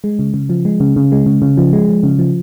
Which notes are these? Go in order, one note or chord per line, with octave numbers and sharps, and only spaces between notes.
G#3
C#3
C#3
F3
G#3
C#3
C#3
G#3
C#3
C#3
F3
G#3
F3
C#3
F3